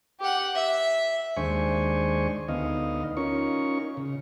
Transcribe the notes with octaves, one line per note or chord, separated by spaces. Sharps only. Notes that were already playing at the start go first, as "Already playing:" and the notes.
G4 F#5
E5
D#2 G#3 D4 C5 G#5 C#6
D2 B3 D#4 D#5 F5
C#4 D#4 F4 A#4 C#6
C#3